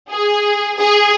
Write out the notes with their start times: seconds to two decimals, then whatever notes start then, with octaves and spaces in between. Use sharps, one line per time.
0.11 G#4
0.78 G#4